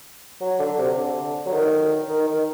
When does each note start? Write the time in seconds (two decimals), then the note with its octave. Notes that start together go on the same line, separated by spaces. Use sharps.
0.41 F#3
0.59 D3
0.78 C3
0.97 D3
1.46 F#3
1.52 D#3
2.09 D#3
2.27 D#3